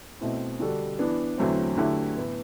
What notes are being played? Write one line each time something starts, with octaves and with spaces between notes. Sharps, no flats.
B2 A3 C4 E4
D3 G3 D4 F#4 A4
E3 B3 D4
E2 D3 F#3 A3 C4
D3 F#3 A3 E4 G4
A2 E3 B3